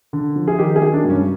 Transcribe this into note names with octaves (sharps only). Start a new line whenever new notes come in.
D3
F3
G#4
D#3 G4
G#4
F#3
D4
G2
C#4